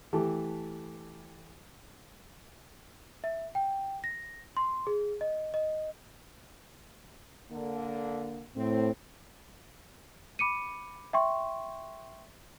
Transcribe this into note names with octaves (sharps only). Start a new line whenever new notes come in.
E3 A3 G4 A5
E5
G5
A#6
C6
G#4
D#5
D#5
D3 A#3
A2 C4
B5 D6 C#7 D#7
E5 G5 C6 C#6